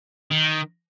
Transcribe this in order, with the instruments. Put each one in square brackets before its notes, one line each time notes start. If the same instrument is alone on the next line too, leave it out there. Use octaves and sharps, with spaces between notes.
[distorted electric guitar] D#3